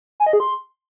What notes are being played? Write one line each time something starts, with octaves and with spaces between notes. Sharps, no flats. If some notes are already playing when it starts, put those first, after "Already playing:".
G#5
D#5
G#4
C6